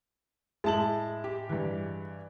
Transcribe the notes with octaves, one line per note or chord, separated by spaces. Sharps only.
A2 G#3 E4 A5 F#7
G4
G2 E3